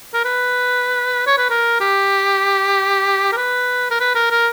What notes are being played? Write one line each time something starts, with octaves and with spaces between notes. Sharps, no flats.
A#4
B4
C#5
B4
A#4
G4
A#4
B4
A#4
B4
A#4
A#4